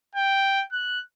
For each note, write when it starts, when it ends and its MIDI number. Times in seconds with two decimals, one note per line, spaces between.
0.15 0.63 79
0.72 1.00 90